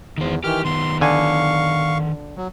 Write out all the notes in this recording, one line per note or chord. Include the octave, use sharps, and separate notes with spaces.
E2 D#3 C5
D#3 E3 G4 F6
D#3 B3 C6
D3 F5 G#5 C#6
F#3